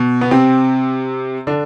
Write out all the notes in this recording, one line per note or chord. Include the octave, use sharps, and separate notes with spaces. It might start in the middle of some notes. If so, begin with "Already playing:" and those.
Already playing: B2
B3
C3 C4
D3 D4